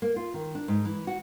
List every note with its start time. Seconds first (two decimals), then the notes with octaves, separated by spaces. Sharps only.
0.02 A#3
0.16 F4
0.34 D#3
0.55 D4
0.68 G#2
0.85 E3
1.07 F#4